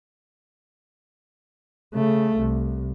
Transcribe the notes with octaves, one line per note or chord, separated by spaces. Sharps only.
C#3 A3
C2